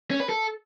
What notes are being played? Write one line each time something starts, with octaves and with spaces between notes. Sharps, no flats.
C#4
B4
A4